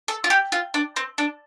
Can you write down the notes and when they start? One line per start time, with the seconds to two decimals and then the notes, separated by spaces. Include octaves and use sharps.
0.08 A4
0.24 F4
0.30 G4
0.52 F4
0.74 D4
0.96 C4
1.18 D4